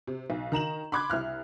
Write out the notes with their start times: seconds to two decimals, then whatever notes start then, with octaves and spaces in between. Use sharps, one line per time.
0.07 C3
0.30 B1
0.52 D#3 A#5 E7 F#7
0.92 B5 C6 D6 F#6 G#6
1.10 C2 E4 F6 F#6